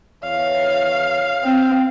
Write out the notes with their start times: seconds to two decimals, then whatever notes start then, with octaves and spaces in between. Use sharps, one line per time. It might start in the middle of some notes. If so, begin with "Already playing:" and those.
0.23 E2 E3 C#5 F5
1.43 C4